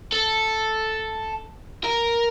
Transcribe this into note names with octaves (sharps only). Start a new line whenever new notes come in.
A4
A#4